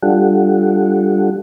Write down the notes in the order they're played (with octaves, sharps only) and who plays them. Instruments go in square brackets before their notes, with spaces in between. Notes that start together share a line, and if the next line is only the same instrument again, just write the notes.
[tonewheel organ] G3 D4 F4 G4 A4 F#5